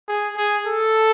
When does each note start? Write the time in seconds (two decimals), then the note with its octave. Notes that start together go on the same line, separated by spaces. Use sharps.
0.08 G#4
0.37 G#4
0.66 A4